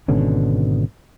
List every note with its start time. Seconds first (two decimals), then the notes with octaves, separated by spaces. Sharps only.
0.08 G#1 B2 D3 C#4